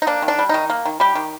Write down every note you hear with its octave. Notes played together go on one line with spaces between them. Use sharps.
D#4
A#3 D4
D#3
D4
G3
D#3 D#4
A#3
D#3
G3 G4
D#3